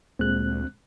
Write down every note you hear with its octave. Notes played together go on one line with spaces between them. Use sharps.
D2 A#2 G#3 C4 F#6